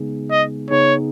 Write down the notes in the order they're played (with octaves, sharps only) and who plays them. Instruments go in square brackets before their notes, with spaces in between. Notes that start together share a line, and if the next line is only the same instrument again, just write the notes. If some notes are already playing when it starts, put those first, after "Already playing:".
Already playing: [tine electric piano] C#3 G#3 B3 D#4 G#4
[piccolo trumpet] D#5
[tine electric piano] C#3 B3 D#4 G#4 [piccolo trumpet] C#5